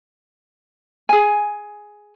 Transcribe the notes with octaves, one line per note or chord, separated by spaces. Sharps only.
G#4 G#5